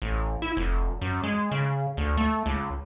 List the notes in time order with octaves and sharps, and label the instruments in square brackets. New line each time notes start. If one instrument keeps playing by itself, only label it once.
[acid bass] A1
E4
F1
F#2
G#3
C#3
D2
A3
C#2